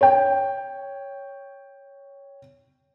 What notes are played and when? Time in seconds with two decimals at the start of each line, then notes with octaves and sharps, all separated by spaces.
0.01 C#5 G5